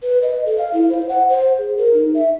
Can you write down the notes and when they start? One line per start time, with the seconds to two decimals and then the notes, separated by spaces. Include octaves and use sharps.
0.02 B4
0.22 D#5
0.46 A4
0.58 F5
0.73 E4
0.90 C5
1.09 F#5
1.29 C5
1.58 G#4
1.78 A#4
1.94 D#4
2.15 E5